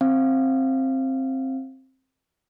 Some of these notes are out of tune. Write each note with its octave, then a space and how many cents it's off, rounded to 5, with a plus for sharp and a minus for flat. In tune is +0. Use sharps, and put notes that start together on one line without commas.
C4 +15 F5 -25